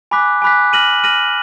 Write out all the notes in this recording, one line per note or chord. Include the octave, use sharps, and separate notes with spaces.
G#5 B5 D6 F#6 B6
G#5 B5 D6 F#6 B6
F6 A#6 D#7 F#7
F6 A#6 D#7 F#7